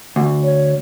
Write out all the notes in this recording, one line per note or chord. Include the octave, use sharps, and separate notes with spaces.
D2
C#5